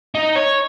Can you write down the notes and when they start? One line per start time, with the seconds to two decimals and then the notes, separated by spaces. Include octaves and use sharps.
0.15 D#4
0.36 C#5